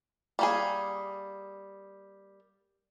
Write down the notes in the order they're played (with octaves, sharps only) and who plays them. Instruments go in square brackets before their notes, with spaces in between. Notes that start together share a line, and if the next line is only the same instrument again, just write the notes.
[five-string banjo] G3 A#3 G#4